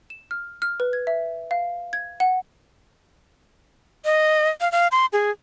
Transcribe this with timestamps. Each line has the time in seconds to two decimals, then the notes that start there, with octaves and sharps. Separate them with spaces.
0.10 E7
0.31 F6
0.62 F6
0.80 B4
0.93 G#6
1.07 E5
1.51 F5
1.93 G#6
2.20 F#5
4.05 D#5
4.61 F5
4.72 F5
4.92 C6
5.13 G#4